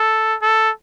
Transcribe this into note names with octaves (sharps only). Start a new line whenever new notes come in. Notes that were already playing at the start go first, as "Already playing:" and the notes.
Already playing: A4
A4